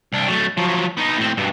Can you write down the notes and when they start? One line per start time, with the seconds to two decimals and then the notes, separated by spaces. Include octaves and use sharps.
0.12 C2 D4
0.28 F#3 A3
0.57 F3 F#3
0.97 B3 D#4
1.18 A2 C4
1.37 G2 B2